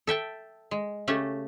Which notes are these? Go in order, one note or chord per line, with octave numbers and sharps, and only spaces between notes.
A4 E5 G5 A5
G#3
C#3 A3 C#4 G4 A4